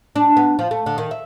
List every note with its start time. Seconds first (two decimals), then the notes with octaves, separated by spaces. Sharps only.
0.16 D4
0.37 B3
0.59 F3
0.71 A3
0.86 D3
0.98 D#3
1.11 E5